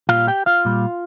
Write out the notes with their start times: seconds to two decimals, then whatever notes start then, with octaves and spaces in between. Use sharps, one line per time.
0.09 A#2 G3 F4 F5
0.27 G4 G5
0.46 F4 F5
0.65 A#2 G3